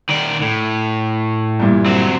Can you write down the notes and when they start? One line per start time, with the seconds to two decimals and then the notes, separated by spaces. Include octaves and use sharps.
0.09 D#3 D5
0.42 A2
1.60 G2 A#2 E3
1.86 F#3 C4